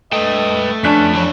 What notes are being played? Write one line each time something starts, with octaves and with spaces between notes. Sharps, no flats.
A3 B4 D#5 G5
F2 C#4 D4 A5 F#6 B6
E3 A3 C#5